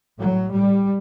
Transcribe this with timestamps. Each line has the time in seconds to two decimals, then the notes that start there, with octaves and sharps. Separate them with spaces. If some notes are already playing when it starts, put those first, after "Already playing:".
0.18 A2 F#3
0.52 A2 G3